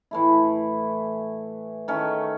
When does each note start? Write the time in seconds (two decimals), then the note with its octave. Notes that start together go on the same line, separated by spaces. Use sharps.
0.11 A2 E3 A3 E4
1.88 D#3 A3 C#4